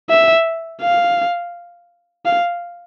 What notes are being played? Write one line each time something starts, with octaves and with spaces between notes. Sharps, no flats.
E5
F5
F5